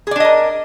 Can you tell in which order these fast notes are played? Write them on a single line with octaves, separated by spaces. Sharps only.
G#4 D5 D4 D#5 A#4